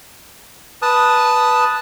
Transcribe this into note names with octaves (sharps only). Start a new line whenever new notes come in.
B4 A5 D#6